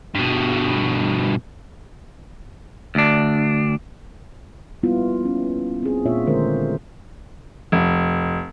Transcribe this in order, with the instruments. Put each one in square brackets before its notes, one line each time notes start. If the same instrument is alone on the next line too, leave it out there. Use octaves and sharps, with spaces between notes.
[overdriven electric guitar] G2 B2
[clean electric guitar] D2 D4
[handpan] G3 A#3 B3 E4 F4
C#4
C4 G#4
A#2 A#3 D4 F4 C#5 E5
D3 D#3 G#3 A3 A#4 C5
[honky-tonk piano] F1